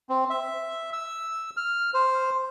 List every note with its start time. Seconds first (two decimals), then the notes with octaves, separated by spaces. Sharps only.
0.09 C4
0.30 E5
0.93 E6
1.57 F6
1.94 C5